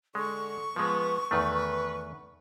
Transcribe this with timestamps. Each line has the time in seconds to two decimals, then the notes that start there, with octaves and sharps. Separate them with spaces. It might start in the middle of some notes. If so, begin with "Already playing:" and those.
0.15 D3 G#3 C#6
0.76 F3 G#3 B3
1.31 E2 D#3 A3 B4